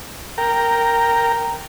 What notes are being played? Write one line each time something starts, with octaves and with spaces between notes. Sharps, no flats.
A#4 G5 A#5